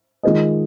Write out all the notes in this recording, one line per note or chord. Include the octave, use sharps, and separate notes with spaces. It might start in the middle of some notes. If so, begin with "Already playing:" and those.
D#3 G#3 F4 G#4 D#5